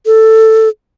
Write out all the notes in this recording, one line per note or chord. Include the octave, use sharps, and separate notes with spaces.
A4